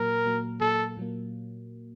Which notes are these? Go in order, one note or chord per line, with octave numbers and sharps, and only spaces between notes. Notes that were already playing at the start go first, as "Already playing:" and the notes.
Already playing: A#2 F#3 A#3 A#4
A#2 F#3 A#3
A#2 F#3 A#3 A4
A#2 F#3 A#3